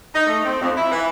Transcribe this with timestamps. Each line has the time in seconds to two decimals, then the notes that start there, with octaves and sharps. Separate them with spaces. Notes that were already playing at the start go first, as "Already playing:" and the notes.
0.13 D#4
0.26 A3
0.43 C4
0.60 F2
0.76 E4
0.90 E3